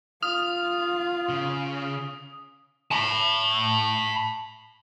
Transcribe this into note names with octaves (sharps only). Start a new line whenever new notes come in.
F4 D#6 F6
C#3
A5 B5